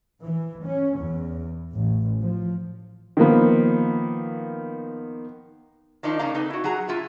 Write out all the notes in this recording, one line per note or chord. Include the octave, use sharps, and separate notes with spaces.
E3
C#4
E2
A1
F3
D#3 F3 A#3 B3
D#3 F3 D4 D#4
C#3 A#3 D4 F5 A#5
C4 D#4 A4 B4
E4 F#4
F#3 F#4 G#4 A#5
B2 E4 F4